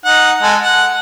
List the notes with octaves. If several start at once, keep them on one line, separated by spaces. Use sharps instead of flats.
D#4 F#5
G#3 A4
F#5